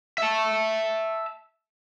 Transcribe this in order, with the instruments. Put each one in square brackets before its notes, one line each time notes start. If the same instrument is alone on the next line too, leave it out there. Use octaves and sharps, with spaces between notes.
[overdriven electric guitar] E5 A5